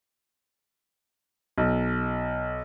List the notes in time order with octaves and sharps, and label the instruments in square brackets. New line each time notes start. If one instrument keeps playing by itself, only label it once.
[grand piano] B1